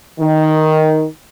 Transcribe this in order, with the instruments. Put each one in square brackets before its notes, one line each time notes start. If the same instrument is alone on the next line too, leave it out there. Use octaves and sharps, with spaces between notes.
[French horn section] D#3